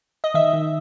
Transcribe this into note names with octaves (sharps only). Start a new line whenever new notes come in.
D#5
D#3 E5
D#3